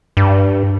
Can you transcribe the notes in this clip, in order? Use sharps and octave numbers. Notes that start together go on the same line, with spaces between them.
G2